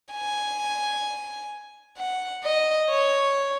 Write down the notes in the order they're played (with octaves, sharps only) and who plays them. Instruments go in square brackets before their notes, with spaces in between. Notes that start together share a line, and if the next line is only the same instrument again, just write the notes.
[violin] G#5
F#5
D#5
C#5